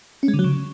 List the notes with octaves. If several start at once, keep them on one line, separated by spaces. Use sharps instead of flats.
C#4
G#3
D3
F#3
C#3